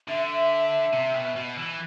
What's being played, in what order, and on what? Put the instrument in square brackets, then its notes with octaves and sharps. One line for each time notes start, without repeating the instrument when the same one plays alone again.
[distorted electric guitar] D3 [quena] E5
[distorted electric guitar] C3
B2
B2
E3